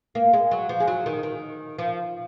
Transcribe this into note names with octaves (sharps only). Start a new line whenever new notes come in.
A#3
G#3
F#3
F3
G#3
F#3
D#3
D#3
F3